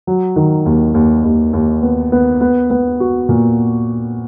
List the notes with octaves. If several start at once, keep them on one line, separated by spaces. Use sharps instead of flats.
F#3
D#3
D#2
D#2
D#2
D#2
B3
B3
B3
B3
F#4
A#2